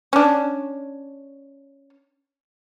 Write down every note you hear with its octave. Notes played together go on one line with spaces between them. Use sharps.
C#4 D4